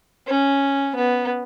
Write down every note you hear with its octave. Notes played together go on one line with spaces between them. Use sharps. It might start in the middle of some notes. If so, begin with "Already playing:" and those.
C#4
B3